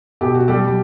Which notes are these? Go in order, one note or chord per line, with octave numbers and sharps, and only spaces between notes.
B2 G4
F#4
G3 G4
G3